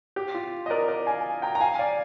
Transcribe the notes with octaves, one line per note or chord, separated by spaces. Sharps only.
G4
F4
D#5
A#4 D5
A#4 D5
F5 G#5
G5 A#5
A#5
F5 G#5
D5 F5